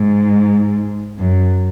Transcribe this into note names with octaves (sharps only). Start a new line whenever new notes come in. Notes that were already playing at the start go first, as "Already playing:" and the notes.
Already playing: G#2
F#2